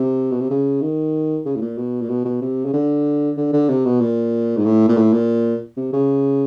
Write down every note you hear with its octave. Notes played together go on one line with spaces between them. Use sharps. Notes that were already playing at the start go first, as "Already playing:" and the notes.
Already playing: C3
B2
C3
C#3
D#3
C#3
A2
A#2
B2
A#2
B2
B2
C3
C#3
D3
D3
D3
C3
B2
A#2
G#2
A2
A#2
A2
A#2
C3
C#3